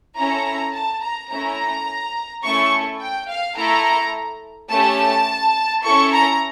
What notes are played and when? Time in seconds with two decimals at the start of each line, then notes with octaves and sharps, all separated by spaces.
0.16 C#4 E4 A4 A#5
0.73 A5
1.02 A#5
1.30 A3 C#4 E4 A#5
2.44 A3 C#4 E4 A4 C#6
3.00 G5
3.28 F5
3.56 A3 E4 A4 A#5
4.70 A3 C#4 G4 A5
5.83 C#4 E4 A4 C#6
6.11 A#5